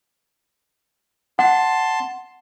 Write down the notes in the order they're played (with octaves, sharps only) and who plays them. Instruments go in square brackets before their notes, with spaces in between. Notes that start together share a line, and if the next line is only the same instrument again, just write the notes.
[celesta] F#5 [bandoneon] A5 C6